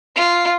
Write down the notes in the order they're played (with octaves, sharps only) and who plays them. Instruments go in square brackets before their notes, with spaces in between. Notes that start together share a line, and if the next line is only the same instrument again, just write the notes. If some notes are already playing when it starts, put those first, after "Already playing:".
[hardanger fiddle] F4